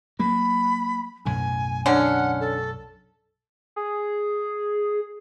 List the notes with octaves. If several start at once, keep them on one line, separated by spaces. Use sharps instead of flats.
F#3 A#3 B5
B1 F#2 A2 G#5
D3 C#4 F#5
A4
G#4